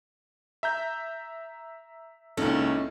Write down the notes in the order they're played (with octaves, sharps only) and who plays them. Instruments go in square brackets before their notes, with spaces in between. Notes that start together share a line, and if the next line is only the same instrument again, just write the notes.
[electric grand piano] E5 A#5 G6
[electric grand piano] C#2 A#2 A4 [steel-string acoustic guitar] C#4 D#4 E4